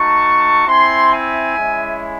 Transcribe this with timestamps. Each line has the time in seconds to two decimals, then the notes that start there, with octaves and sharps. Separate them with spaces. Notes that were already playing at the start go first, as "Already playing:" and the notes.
Already playing: A3 D#4 F#4 A5 C#6
0.67 C4 E4 G#5 C6
1.12 E5 G#5
1.58 G#3 C#4 E4